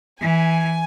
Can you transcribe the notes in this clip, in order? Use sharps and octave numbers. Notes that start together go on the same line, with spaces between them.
E3 G#5